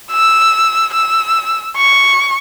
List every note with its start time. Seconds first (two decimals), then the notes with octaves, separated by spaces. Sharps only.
0.11 E6
0.94 E6
1.77 C#6